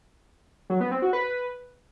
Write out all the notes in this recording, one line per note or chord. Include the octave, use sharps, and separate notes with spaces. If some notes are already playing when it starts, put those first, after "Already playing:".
F#3
B3
C4
F#4
B4